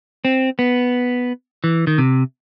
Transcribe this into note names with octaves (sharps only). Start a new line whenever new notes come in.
C4
B3
E3
D#3
C3